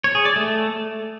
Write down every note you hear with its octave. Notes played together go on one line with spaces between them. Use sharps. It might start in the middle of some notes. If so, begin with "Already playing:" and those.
C#5
G#4
D5
A3